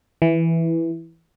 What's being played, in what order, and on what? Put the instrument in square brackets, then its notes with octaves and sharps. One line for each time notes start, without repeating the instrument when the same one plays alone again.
[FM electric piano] E3